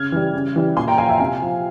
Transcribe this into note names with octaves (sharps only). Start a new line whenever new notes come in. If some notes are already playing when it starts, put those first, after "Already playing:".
Already playing: C#3 F6 G#6
E3 G3
C#3
E3 G3
A#2 G#5 C6
G5 A#5
F3 F5 G#5
E5 G5
C3 F5 G#5
F3